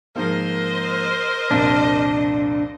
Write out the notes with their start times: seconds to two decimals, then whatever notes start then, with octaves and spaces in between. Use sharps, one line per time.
0.16 G#2 F3 A#3 A#4 C5 D#5
1.51 C2 F2 A#2 D4